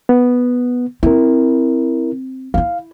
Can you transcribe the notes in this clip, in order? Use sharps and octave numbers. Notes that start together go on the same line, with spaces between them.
B3
C4 E4 A#4
E4 F4 F5